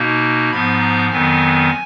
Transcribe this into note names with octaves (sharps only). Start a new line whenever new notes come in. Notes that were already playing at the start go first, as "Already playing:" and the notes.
Already playing: B2 A#3 D#4
G#2 F3 B3 B5
A#5
F2 D#3 F#3 B3 G#5